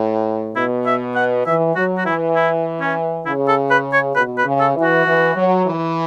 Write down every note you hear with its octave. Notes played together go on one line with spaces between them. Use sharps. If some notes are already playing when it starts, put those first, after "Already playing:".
Already playing: A2
B2 E4
E5
F#5
E3 E5
F#3 F#4
F#4
E3 E4
E4
C#4
C#3 E4
A4
B4
C#5
B2 B4
B4
C#3
A4
E3
F#4
E3
F#3
E3